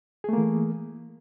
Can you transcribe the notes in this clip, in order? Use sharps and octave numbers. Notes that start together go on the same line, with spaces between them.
E3 A3 A#3 G#4